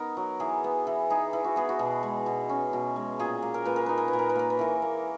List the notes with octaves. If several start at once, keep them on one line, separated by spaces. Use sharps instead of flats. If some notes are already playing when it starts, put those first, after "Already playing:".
Already playing: B3 D#4 A#4
F#3
E3 G#4
B3
E3
D#4 G#4
E3
F#4
B3 G#4
F#4
B2
G#3
B2
C#4
B2
G#3
A#2 G#4
A#3
A#4
A#2 B4
A#4
D#4 B4
A#4
B4
A#2
A#4
B4
A#3 A#4
B4
E3 A#4
A#3